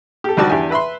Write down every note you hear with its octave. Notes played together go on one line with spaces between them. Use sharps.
G4 A4
D2 D#3 G3 F#4 D5 A5
E2 D4 G4 E5 G#5
B4 E5 B5 C6